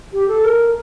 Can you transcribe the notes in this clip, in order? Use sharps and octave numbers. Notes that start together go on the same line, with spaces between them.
G4
A4
A#4